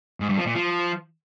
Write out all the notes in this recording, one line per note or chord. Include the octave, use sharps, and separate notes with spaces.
G#2
G2
F3
A#2
F3